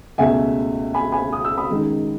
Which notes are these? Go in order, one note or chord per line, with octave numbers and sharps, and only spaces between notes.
C#2 B2 A3 E5 G#5
G#5 B5
G#5 B5
D#6
E6
B5 D#6
F#2 D#3 G#3 D#4